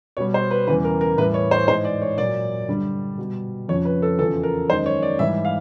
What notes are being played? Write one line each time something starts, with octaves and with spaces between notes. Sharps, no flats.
B2 G3 C#5
C5
B4
E2 C#3 E3 G3 B4
A#4
A#4
A2 E3 G3 B4
C#5
C5
G#2 E3 G#3 C5
D5
C#5
A#2 F#3 D5
G2 D3 G3
B2 G3
F2 C#3 F3 C#5
B4
A4
E2 C#3 F3 A4
A#4
F#2 D#3 G#3 C5
C#5
D5
G#2 E3 G3 E5
F5